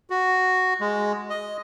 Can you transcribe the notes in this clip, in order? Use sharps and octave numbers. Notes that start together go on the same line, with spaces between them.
F#4
G#3
D#5